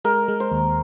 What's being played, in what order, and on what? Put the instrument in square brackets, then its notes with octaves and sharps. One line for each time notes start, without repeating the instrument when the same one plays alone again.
[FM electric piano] G#3 [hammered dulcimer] A#4
[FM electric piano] G#3
[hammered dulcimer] C5
[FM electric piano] D#2